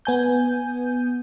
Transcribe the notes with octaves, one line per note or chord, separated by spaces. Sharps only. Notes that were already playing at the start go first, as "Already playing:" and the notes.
B3 G#5 G6